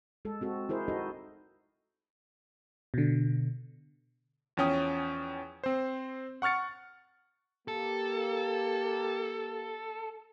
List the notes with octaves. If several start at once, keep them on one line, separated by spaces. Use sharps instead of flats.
G#3 A4
C4 F#4 A4
E4 G#4 A#4 C5
D#4 F#4 A4 D#5
B2 D3
E2 F3 C#4 G5 D#6
C4 C5
F#5 C#6 F6 A6 C#7
A#3 G4 A4